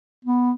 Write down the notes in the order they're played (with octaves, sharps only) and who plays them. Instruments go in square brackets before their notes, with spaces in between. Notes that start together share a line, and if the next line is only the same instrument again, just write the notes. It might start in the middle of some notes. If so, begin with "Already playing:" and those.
[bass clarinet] B3